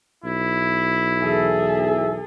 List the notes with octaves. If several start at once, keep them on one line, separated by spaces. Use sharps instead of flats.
B1 E4
E2 G#4 A4 E5